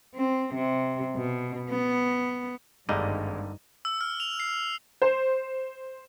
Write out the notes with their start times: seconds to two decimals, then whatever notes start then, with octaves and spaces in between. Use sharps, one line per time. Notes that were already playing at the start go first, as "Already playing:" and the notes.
0.14 C4
0.55 C3
1.16 B2
1.70 B3
2.89 G#1 G2 D3 G3 G#3 A#3 D#4 D#7
3.85 E6
4.01 F6
4.20 F7
4.40 C7
5.02 C5